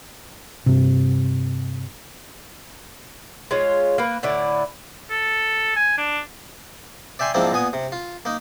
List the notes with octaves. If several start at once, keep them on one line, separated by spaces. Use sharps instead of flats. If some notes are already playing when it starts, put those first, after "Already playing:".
G2 C3
G#3 C#4 F4 C#5
A#3 B4
A2 D3 E4 D5
A4
G#5
D4
D5 E5 G5 G#5 C6
G#2 F3 A#3 C4 D4 E4
A#2 B3 G#5 D#6
C3
F4
A#3 D#4